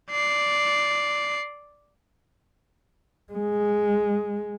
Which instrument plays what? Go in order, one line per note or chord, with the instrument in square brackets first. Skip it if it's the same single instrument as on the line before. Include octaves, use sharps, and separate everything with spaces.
[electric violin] D5 C7
[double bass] G#3